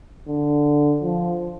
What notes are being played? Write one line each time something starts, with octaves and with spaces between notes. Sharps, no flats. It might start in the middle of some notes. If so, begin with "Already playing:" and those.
D3
F3